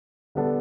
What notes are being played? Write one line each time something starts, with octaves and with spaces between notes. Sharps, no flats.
D3 G3 B3 D4 A4